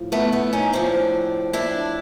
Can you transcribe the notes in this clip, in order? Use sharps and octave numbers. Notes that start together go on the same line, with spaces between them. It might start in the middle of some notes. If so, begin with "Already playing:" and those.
Already playing: A2 F3
A3 B3
A3 B3
C#4 D#4
A2 F3 C4 D4
D4 E4